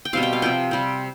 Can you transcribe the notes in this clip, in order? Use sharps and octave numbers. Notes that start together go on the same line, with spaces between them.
G5
B2 G3 C4 F5
G5
F5
C3 F3 C4 G5
C3 G3 C4